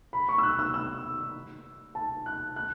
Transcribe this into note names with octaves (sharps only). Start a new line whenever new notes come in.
B5
C#6
E6
F#6
E6
E6
A5
F#6
F#6